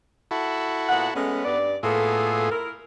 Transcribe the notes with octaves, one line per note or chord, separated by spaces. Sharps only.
E4 F#4 A4
A#2 B3 F#5
G#3 A3 B3 C#4
G2 D5
A2 A#3 B3 F4 G#4 A4
E4 A#4